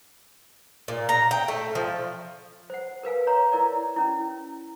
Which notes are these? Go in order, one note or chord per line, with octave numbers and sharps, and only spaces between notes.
A#2
A#5
G5
A3
F3
C5 F#5
A#4 B4 F5 G#5
C#5 F5 A#5 C6
E4 A#4 D5
C#4 E4